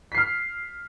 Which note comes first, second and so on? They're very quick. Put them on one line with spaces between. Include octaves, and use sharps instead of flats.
B6 C7 F6